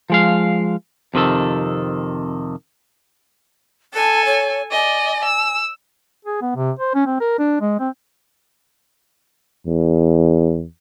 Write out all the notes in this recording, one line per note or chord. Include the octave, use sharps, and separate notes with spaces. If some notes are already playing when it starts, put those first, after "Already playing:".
F3 G#3 F5
F2 C3 D#3 A4
A4 G#5 A5
C#5
D5 D#5 G#5
E6
G#4
B3
C3
C5
C#4
C4
A#4
D4
G#3
C4
E2